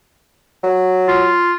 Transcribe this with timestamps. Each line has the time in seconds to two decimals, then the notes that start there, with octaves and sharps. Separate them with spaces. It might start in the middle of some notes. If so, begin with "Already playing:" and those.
0.63 F#3
1.08 F4